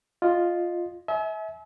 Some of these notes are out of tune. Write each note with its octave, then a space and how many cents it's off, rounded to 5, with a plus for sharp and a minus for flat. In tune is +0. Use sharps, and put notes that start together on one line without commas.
F4 +0 D#5 -15
E5 -30 G#5 +40